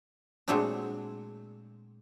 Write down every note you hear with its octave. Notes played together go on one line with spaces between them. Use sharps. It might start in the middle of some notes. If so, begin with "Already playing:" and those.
A#2 F#3 G#3 A3 C4 D4